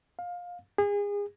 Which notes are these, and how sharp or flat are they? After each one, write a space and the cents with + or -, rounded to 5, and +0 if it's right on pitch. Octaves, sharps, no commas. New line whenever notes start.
F5 +20
G#4 -30